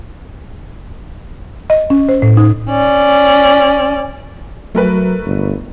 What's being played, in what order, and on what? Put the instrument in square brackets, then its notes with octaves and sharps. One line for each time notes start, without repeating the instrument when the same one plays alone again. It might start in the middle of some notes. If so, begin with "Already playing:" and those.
[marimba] D#5
C#4
C5
A2
D#4
[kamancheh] C#4 D5
[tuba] F#3 [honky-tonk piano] A3 A#4 B4
[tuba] G1